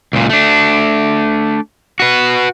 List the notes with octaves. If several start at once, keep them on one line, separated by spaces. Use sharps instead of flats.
C#2 A#2
A3 D4
F#4 B4